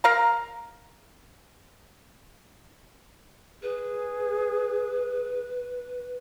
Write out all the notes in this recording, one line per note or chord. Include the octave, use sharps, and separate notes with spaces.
A#4 F5 A#5
G#4 B4